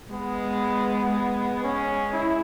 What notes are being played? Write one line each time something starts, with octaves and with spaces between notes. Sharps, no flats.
G#3 B3
G#3
C#4
E4